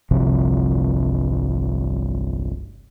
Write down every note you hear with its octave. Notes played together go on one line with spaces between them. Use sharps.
G1 C2 C3 F3